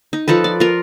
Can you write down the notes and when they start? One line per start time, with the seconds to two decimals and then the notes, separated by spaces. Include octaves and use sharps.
0.13 D#4
0.28 F3 D#4 A4 B4
0.44 D5
0.60 F4 A#4